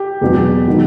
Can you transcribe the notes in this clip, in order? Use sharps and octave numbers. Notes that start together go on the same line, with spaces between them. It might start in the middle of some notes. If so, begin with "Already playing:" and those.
Already playing: G4
E2 B2 F#3
D#3 F#3